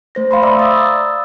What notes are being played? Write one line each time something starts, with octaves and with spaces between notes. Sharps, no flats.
A3 C5 A#6
F5 B5 C6
D5 E5 A#5 B5 D6 E6
D#6 E6 A6